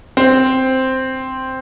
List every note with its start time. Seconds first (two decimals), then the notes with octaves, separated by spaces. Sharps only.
0.17 C4